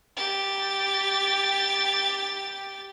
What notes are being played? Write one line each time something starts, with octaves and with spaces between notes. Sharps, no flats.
G4 A6